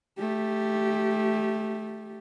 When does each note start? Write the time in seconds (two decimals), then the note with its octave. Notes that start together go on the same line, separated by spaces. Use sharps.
0.19 A3 G4